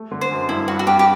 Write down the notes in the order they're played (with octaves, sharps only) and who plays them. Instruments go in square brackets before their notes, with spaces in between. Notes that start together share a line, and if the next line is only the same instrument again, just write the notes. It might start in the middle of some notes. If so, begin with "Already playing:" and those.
Already playing: [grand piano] A3
D3
[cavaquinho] C5
[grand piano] F#2
[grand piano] G2 [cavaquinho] E4
[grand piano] G2 [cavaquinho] F#4
[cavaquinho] F#4
[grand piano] G2 [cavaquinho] G4
[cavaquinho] G4